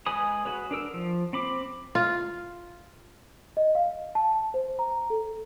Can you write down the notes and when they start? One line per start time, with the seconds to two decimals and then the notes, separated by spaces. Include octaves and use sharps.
0.06 G#3 B4 G#5 B5 D#6
0.45 F#4 G#4 B4 C#5
0.71 D4 A#4 E6
0.94 F3
1.33 C4 B5 D6
1.95 F4
3.57 D#5
3.75 F5
4.15 A5
4.54 C5
4.79 A#5
5.10 A4